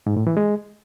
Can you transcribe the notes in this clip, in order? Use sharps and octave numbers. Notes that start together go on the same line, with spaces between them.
G#2
A2
E3
G#3